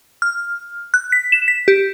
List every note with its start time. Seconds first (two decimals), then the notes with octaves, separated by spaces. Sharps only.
0.22 F6
0.94 F#6
1.12 B6
1.32 E7
1.48 B6
1.68 G4